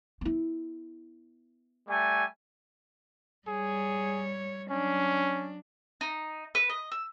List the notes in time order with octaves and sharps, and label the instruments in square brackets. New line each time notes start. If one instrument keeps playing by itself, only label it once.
[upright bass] B3 E4
[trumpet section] G3 A3 G#5
[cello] G3 C#5 [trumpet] G#4
[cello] F#3 D4 [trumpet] C#4
[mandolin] D#4
B4
D#5
E6